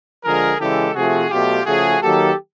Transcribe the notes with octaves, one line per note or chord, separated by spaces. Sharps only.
D3 F3 G#3 G#4 A#4
C#3 E3 G#3 G4 A4
C3 F3 A3 F#4 G#4
B2 F#3 A3 F4 G4
C#3 F3 A3 F#4 G#4
D#3 F#3 A#3 G4 A4